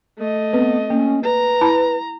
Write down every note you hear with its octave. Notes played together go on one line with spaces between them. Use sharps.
A3 D#5
B3 C4 B4
A#3 C#4
B4 A#5
E4 A5 B5